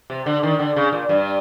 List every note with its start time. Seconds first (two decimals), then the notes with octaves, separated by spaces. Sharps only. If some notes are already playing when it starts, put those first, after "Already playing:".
0.10 C3
0.26 D3
0.43 D#3
0.59 D3
0.76 C#3
0.93 A#2
1.09 G2